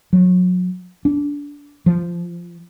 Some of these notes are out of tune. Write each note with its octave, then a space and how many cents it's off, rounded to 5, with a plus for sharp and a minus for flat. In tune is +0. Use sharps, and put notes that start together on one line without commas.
F#3 -30
D4 -20
F3 -15